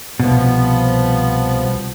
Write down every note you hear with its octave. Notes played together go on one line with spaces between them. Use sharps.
C2 B2 F3 B3